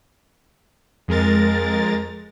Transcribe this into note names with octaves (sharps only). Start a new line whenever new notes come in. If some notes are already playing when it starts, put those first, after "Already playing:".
F2 G#3 A#4 A6